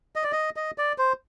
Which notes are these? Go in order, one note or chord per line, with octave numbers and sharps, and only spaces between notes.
D#5
D5
D#5
D#5
D5
C5